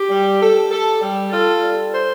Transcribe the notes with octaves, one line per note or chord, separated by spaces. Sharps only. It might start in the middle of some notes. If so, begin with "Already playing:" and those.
Already playing: G4
G3
A4
A4
G3
F4 A4
G3
C5